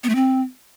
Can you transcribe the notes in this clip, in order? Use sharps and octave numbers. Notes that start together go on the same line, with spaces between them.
B3
A3
C4